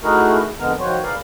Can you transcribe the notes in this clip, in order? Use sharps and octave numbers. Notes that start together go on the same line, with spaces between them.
A3 D#4 E4 F#4 G#4 A#4
F2 D3 G#3 B3 A#4 A#5
D#3 F3 F#4 C5 C#5
G#4 A#4 B4 D5 F5